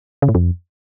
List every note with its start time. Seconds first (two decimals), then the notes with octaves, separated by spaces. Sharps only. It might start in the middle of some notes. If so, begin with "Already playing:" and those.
0.22 C#3
0.29 A2
0.35 F2